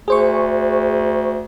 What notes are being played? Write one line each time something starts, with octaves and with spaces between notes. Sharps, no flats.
D2 G#4 C5 C#6